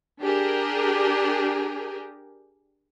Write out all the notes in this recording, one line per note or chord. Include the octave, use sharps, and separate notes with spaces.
D4 G4 G#4 A#4